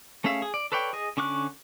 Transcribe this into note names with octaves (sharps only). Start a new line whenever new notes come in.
A3 C#4 G#4 E5 F5
G#4
D5
A4 B4 C#5 D5 G5
G#4 D#5
D3 C#4 C#6 D6 F#6